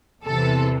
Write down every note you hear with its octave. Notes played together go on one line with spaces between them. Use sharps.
E2 C3 E3 A4